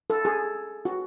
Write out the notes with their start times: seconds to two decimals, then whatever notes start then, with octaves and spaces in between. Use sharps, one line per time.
0.10 A4
0.25 G#4
0.85 F#4